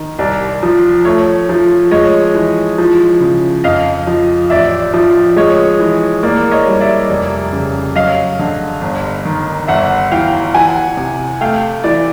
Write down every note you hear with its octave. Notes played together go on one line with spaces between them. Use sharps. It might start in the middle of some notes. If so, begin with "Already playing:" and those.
Already playing: D#3
C2 D5
F3
A3 C#5
F3
G#3 C#5 D#5
E3
F3
C#3
F2 D#5 F5
F3
A1 D5 E5
F3
G#3 C#5 D#5
E3
A#3 D5
C#5 D#5
G3
D5 E5
F1
C#3
F#3 D#5 F5
D3
G1
D#3
G1 E5 F#5
E3 F5 G5
E3 F#5 G#5
C3
A3 F5 G5
E3 D5